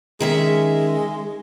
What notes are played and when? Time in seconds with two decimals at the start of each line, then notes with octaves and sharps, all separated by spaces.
0.20 D#3 G#3 C#4 E5